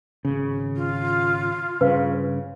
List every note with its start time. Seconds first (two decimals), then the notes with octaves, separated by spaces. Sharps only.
0.25 G#1 C#3
0.75 F4
1.81 G2 C#3 B4 F5